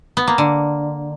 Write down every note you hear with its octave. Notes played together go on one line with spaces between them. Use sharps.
B3
A#3
D3